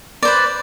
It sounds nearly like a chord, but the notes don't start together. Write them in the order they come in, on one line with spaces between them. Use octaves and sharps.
D5 C5 B4